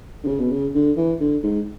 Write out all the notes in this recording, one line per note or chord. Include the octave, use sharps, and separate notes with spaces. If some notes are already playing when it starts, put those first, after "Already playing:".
D3
C#3
B2
C#3
D3
E3
D3
G#2